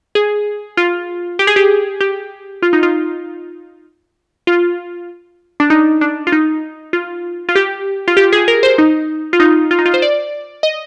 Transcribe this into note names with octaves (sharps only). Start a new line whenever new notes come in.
G#4
F4
G4
G#4
G4
G4
F4
D#4
F4
F4
D4
D#4
D4
F4
D#4
F4
F4
G4
F4
G4
G#4
A#4
C5
D#4
F4
D#4
F4
D#4
F4
C5
D5
D#5